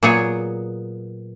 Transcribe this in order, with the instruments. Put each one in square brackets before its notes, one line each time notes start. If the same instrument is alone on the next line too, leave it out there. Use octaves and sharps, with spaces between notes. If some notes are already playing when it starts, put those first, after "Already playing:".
[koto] A#2 F#3 B3 G#4 C#5 G#5